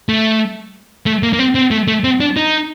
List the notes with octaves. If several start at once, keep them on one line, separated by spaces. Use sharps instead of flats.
A3
A3
A#3
A#3
C4
C4
A3
A3
C4
D4
D#4